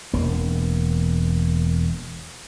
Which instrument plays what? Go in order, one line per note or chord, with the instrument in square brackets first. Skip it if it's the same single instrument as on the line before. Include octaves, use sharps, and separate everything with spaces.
[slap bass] E1 A#3